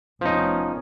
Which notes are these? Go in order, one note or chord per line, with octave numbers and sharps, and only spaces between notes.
F1 F3 B3 C#4 D#4